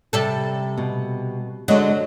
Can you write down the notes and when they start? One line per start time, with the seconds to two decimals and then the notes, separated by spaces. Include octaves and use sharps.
0.13 C3 G3 A4
0.77 B2
1.68 D3 F#3 G#3 D#5